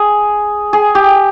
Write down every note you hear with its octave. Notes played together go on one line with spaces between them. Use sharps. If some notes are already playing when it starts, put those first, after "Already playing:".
Already playing: G#4
G#4
G4